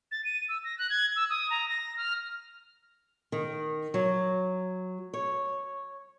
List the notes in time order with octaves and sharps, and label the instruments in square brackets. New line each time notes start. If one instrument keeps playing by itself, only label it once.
[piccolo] A6
D#7
E6
A#6
F#6
G#6
E6
D#6
A#5
A#6
F6
[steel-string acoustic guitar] D#3
F#3
C#5